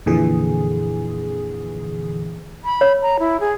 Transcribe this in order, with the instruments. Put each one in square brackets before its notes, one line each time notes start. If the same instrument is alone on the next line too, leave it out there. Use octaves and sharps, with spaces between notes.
[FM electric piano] F2 A#2 D3 E3 G#4
[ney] B5
[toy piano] C#5
[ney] A#5
E4
G#4